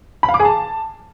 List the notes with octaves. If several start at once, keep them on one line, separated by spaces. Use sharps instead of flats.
B5
F5
D6
G#4
A5